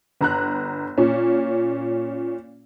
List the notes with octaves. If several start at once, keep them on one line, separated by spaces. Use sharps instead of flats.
G1 A#5 F#6
A#2 C#4